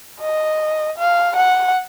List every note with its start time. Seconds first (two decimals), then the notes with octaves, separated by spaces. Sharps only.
0.20 D#5
0.98 F5
1.37 F#5